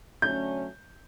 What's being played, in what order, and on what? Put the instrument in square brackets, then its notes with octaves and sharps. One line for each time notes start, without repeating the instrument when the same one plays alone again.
[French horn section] D3 F#3 A3 C#4 [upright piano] G6